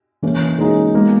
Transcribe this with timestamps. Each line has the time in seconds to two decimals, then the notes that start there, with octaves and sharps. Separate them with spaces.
0.22 E3 A#3 C#4
0.58 G#3 A#3 C#4 D#4 F#4
0.94 G#3 A#3 B3